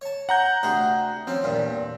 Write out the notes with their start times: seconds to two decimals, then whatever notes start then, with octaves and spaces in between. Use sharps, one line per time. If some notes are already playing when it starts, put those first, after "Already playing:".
0.01 C#5 A5
0.29 F#5 A#5 G6
0.63 D2 C3 G#4
1.27 F3 C4 C#4
1.44 E2 G2 A#2